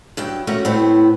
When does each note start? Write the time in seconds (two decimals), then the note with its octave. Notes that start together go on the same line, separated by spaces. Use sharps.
0.17 G2 F#3 G5
0.47 A3 A#3 C#4 F#4
0.65 A2 B3 C4